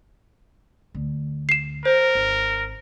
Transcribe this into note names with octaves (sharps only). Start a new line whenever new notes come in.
D2
C7 E7
A#4 C5
G#1